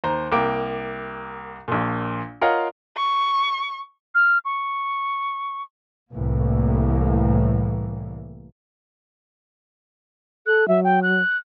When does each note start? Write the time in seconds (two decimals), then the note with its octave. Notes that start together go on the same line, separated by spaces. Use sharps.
0.04 D#2 C5 A#5
0.32 C2 A#3 G5 D6 D7
1.68 A#1 A#2
2.41 F4 A#4 C#5 D#5 F5 F#5
2.97 C#6
4.15 F6
4.45 C#6
6.13 C2 A2 E3 A#3
10.46 A4 F#6
10.68 F#3 E5
10.84 G5
11.03 F#6